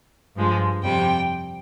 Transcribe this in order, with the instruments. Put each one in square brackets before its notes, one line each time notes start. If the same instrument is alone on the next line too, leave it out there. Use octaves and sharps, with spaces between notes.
[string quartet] G2 F3 G#3
F2 C3 G3 G5